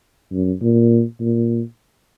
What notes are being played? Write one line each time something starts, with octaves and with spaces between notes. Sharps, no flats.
F#2
A#2
A#2